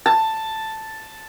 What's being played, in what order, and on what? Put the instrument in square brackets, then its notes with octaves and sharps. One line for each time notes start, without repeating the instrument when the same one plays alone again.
[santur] A5